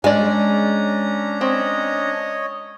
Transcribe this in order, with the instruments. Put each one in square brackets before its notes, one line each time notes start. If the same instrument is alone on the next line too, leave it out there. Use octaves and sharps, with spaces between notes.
[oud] G#3 [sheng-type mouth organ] C#4 D4 A#5 [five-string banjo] D5 G#5
[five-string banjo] C4 [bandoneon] C#5 D#5